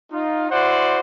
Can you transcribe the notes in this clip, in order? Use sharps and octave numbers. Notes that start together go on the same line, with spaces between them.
D#4 F4
E4 F#4 C5 D5 F#5 C6